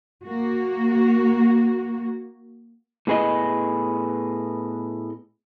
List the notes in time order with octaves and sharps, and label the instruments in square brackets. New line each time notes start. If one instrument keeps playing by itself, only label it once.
[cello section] A#3 F#4
[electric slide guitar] A2 B3 G#4 B4 D#5